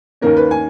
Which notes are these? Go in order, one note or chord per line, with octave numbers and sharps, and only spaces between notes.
D#2 D#3 A#3 C#4 A#4
B4
G#5